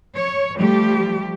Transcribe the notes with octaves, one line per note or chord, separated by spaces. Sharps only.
C#5
F3 G3 A3 G4